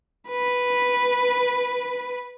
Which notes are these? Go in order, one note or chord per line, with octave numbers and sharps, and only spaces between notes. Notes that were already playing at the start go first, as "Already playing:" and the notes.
B4